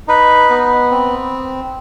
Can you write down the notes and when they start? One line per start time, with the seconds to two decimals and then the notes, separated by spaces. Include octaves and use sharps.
0.08 D#4 B4
0.50 B3
0.91 C4